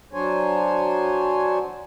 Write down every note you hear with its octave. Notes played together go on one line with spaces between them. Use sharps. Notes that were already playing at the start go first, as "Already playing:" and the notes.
F#3 D4 C5 C#5 G#5